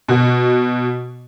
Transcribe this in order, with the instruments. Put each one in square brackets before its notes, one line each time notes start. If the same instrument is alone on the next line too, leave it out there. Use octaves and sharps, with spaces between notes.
[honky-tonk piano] B2 F#4